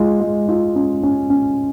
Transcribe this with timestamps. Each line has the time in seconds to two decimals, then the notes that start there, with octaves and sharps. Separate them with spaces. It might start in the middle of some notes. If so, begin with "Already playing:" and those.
Already playing: G#3 F4
0.20 G#3
0.48 F4
0.75 C#4
1.03 C#4
1.30 C#4